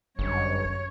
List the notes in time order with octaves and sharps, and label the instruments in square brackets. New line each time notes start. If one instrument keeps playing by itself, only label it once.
[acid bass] G1 [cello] F#2 C#5